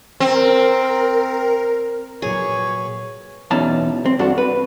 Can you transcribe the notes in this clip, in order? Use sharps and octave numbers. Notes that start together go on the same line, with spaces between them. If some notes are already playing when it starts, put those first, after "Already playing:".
C4 A#4
A#2 F#3 A#3 G#4 B4 C#5 C#6
E2 B2 C#4 D#4 A5
C4
G2 D4 F#4 A4
B4